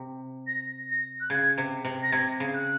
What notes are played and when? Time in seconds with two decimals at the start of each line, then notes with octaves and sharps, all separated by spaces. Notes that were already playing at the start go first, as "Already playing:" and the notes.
Already playing: C3
0.47 A#6
0.89 A#6
1.20 F#6
1.30 C#3 G#6
1.58 C3
1.85 C3
2.03 A#6
2.12 C3 G#6
2.40 C#3 G#6
2.54 F#6